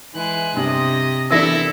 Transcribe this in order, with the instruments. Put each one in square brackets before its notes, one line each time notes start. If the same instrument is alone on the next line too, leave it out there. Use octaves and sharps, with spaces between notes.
[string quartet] E3 G#3 F#6
[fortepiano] G2 [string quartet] C3 [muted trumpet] D#5
[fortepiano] C3 E3 D4 [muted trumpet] E4 [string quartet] A4 [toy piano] A#4 E5